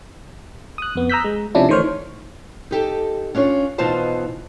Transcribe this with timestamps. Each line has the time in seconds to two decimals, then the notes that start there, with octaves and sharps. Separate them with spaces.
0.78 D#6 F#6
0.95 F2 B3
1.10 A#5 D#6 E6 F#6 G6 B6
1.24 G#3
1.55 C3 F3 C#4 D4 E4
1.69 D#3 E3 A3 C5 C#5 F6
2.71 D#4 G4 A4
3.35 C#4 D4 F4 C#5
3.78 B2 E3 D#4 F4 C5 A5